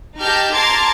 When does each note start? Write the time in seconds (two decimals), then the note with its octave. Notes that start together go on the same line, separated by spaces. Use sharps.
0.18 D#4 G4 A5 F6 G6 A#6
0.52 A5 A#5 C6 D6 G#6 A6